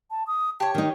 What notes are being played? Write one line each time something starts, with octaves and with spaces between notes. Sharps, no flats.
A5
D#6
G4 C#5 A5
D#3 D#4 A#4